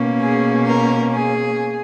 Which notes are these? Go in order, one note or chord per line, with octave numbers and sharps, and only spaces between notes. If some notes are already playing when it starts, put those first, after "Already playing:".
Already playing: B2 A#3 C#4
G#4
A#4
G#4